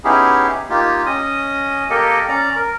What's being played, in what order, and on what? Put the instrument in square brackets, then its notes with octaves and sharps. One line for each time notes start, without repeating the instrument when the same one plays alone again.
[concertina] B3 C#4 D#4 E4 G4 G#4
A#3 D#4 F4 G4
C#4 D#5 D#6
A#3 G4 A4 A#4 D#5
C#4 D5 A#5
A#4